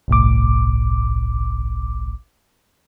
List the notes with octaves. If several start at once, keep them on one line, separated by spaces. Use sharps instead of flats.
G1 C2 A2 D6